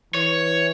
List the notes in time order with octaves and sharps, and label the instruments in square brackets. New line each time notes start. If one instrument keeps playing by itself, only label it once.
[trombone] E3 [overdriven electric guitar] C#5